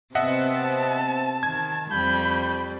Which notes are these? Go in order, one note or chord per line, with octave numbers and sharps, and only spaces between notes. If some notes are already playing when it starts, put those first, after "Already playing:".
C3 B3 C4 D#5 E5 F#5 A5
D#3 G#6
F2 G3 B5 G6